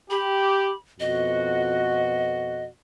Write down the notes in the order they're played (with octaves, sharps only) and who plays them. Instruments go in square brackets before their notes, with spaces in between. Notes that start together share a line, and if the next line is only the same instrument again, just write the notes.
[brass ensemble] G4 [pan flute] B5
[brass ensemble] F2 B2 F#4 [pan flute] D#5